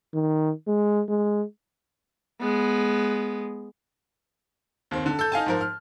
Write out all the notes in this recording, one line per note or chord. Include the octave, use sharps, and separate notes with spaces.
D#3
G#3
G#3
G#3 B3
D#2 D#3 C4
D3
A4 G6
D#4 F5 G#5 A5
G#2 F3 A#4
F6